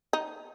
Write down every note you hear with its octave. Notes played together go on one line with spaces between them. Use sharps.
D#4